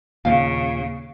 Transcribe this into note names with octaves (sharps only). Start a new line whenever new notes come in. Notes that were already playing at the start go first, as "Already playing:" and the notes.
D#2 A#2 C#3 F5